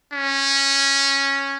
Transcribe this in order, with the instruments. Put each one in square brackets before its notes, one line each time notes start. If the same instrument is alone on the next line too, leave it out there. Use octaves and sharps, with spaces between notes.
[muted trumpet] C#4